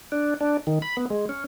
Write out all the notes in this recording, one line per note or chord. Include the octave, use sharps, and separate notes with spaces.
D4
D4
D#3
B5
B3
G#3
C#4